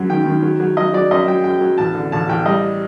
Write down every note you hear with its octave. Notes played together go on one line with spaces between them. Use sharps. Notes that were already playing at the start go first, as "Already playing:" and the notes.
Already playing: F#2 F#3
D#3 G5
D#3
F#3
F#3
F#3 D#5
F#3 D5
F#2 D#5
F#3 G5
F#2 G5
F#3
A1 A5
D3
A1 A5
A1 G5
G3 D#5